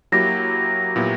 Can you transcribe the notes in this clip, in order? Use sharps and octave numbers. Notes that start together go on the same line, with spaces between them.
F#3 A#3 E4 G4 A#6
A#2 F#3 B3 E4 G4